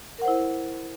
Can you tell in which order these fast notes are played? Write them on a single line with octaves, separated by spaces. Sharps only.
A#4 F#5 C5 E4